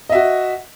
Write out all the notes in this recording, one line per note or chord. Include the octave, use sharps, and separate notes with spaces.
F#4 D#5 E5